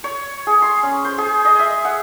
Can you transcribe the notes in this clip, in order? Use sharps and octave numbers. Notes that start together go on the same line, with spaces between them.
C#5
G#4
C6
C#4
C5
G#4
D#5
E5
F#5